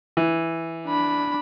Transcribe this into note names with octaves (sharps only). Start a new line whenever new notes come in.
E3
D4 B5